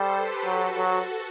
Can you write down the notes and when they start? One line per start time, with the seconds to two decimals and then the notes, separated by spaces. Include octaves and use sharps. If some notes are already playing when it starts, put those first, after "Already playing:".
Already playing: G3 A4 C5
0.13 G4 B4
0.45 F#3 F#4 A4
0.78 F#3